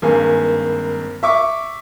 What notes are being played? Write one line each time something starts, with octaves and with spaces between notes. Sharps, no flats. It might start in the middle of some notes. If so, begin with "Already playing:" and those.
G#1 G2 A#3 G#5
E5 C#6 D6